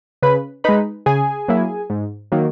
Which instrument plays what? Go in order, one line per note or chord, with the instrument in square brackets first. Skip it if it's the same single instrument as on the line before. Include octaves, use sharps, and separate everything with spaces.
[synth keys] C#3 B4 B5
G#3 D#4 B4 B5
C#3 G#4 G#5
F#3 A#3 E4
G#2
D#3 F#3 A#3